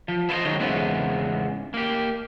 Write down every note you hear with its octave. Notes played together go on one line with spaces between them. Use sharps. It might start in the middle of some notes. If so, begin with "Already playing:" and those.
F3
E4 F4 A4 C5 D#5
D#3 F#3 G#3 D#4
E2 G#2 C#3 B3 C4
A#3 G4